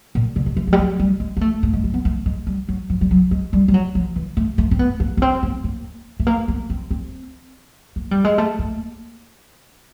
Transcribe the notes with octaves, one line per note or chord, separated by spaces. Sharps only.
A#2
D3
D#3
E3
F3
G3
F#3
G3
G#3
A#3
A3
A#3
G#3
G3
B3
A3
G#3
G3
F#3
F3
G3
F#3
G#3
G3
G3
F#3
F3
E3
A3
A3
C4
B3
A#3
B3
C4
B3
A#3
A3
A#3
B3
C4
C4
A#3
G3
G#3
A3
A#3